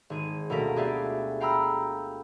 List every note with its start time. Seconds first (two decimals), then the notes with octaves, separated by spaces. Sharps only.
0.10 G#1 G#4 D#7
0.50 D2 B2 A3 A#3 A#4 B6
0.76 B3 G4 G#4 D5 E5 F5
1.40 F5 G5 A#5 B5 E6 F6